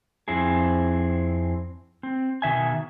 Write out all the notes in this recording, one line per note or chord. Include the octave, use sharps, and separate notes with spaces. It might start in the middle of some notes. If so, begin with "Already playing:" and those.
F2 C4 E4 G#4
C4
B2 D#3 E5 G#5